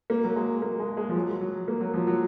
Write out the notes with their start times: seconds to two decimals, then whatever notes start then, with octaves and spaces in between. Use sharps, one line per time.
0.10 A#3
0.24 F#3
0.36 G#3
0.62 A#3
0.80 G#3
0.97 G#3
1.09 F3
1.16 F#3
1.41 F#3
1.68 A#3
1.81 F#3
1.94 F3
2.07 F#3